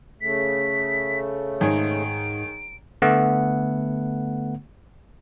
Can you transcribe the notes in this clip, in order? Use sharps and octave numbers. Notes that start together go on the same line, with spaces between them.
C#3 A3 B6
G#2 D#3 G#3 G#4 C#5 D7
D3 A3 B3 F#5